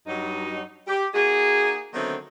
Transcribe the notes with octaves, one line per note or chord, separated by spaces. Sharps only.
G2 F#3 D#4
G4
A#3 D#4 F#4 G#4
D3 D#3 F#3 A3 B3 C4